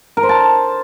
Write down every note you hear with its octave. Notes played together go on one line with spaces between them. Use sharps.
A#4
C5
A5